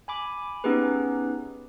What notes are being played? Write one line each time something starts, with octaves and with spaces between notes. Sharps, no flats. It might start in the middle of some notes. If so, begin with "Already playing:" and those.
G#5 B5 D6
B3 C#4 D#4 G4 G#4 B4